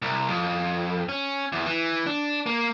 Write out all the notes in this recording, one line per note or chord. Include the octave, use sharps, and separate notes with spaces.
C2
F2
C#4
E2
E3
D4
A#3